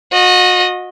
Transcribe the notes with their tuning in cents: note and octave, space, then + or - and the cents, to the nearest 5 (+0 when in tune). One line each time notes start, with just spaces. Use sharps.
F#4 -35 D#5 +0